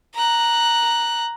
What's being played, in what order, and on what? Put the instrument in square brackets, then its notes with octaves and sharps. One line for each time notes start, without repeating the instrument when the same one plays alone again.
[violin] A#5 F#6